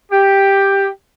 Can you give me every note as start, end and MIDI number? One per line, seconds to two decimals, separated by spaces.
0.12 0.88 67